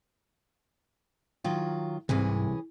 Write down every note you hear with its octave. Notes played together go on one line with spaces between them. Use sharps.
D#3 F#3 F4
C2 G#2 C3 E3 C#4 G#4